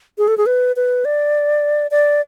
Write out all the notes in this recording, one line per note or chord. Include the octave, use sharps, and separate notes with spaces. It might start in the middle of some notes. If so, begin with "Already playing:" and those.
G#4
A4
G#4
B4
B4
D5
D5